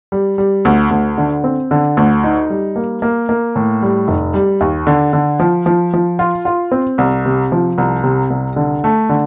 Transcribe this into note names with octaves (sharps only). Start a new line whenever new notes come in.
G3
G3
D2
D2
D3
C4
D3
D2
D#4
G3
A#3
A#3
A#3
A2
G3
F1
G3
D#2
D3
D3
F3
F3
F3
F4
F4
C4
C2
C3
F3
C2
C3
C2
D3
A3
D3